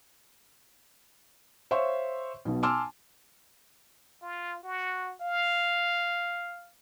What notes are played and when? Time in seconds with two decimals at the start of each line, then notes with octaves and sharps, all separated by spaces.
1.71 C5 C#5 E5 F5 C6 C#6
2.45 B1 B2
2.63 G#5 A5 C6 D6 E6 F6
4.22 F4
4.63 F#4
5.21 F5